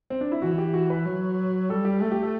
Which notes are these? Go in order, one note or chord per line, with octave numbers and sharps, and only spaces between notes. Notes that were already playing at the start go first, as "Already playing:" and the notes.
C4
D4
E4
E3 F#4
F#4
G4
F#4
B4
F#3
G3 A4
G4
A3 A4
G4
A4